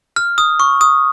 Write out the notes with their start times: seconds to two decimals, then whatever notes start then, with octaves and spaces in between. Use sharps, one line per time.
0.16 F6
0.38 D#6
0.60 C#6
0.81 D#6